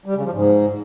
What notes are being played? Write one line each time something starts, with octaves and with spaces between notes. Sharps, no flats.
G3
C#3
F3
G#2